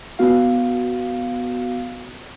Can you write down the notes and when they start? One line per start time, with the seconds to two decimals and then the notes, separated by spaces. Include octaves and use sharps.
0.19 B3 F#4 F5